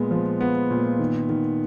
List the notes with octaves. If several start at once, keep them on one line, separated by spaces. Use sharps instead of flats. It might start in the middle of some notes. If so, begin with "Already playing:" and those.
Already playing: A#2 G#3 B3
F3
B3
A#2
D#3
D#3